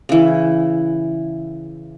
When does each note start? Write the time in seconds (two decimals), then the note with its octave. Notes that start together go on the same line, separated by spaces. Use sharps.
0.09 C#3 E3